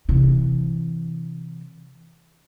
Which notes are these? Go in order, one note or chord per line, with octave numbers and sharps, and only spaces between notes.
C3 E3